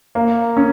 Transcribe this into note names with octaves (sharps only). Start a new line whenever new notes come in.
A#3
C#4